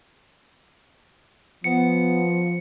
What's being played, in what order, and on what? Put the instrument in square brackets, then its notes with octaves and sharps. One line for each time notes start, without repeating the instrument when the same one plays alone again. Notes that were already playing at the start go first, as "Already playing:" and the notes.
[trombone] F3 [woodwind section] B3 [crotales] C#7